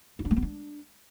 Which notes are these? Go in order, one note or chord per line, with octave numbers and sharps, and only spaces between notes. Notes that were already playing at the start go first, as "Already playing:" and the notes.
D#4
D4
A3
B3
D4